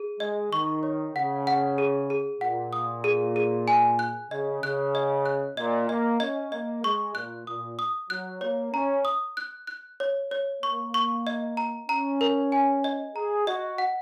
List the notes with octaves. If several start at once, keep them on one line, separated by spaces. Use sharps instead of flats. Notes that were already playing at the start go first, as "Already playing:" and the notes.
Already playing: G#4
G#3 D#5
D#3 C#6
C#5
C#3 F#5
F#5
G#4
G#4
A#2 F#5
D#6
G#4
G#4
G#5
F#6
C#3 D#5
C#3 F#6
D#5
F#6
A#2 D#5
A#3 D#5
C#4 D#5
A#3 D#5
G#3 C#6
A#2 F#6
A#2 D#6
D#6
F#3 F#6
A#3 C#5
C#4 A#5
D#6
F#6
F#6
C#5
C#5
A#3 C#6
C#6
D#5
A#5
C#4 A#5
A#4
G#5
D#5
G#4 A#5
F#4 D#5
F#5